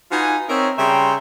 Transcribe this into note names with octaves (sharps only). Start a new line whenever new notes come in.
D#4 F4 F#4 B4 G#5
C4 D#4 A#4 C#5 E5
C#3 G3 E5 G5 A#5 C6